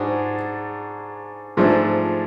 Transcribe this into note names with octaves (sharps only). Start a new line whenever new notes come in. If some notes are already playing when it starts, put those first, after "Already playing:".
Already playing: G#2 G#3 D4 F#4
G#2 F3 A3 D4